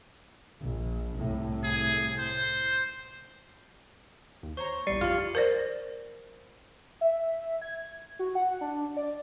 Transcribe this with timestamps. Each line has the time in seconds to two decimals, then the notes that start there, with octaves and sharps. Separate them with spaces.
0.60 A#1
1.17 C2 A2
1.64 G#4
2.18 C5
4.43 D#2
4.57 C5 C#5 A#5 C#6
4.87 A#1 E2 G3 D5 C7 C#7
5.01 F2 F4 G4 C6 F6
5.35 A#4 C5 D5
7.01 E5
7.62 G#6
8.19 F#4
8.35 F#5
8.61 D4
8.97 D5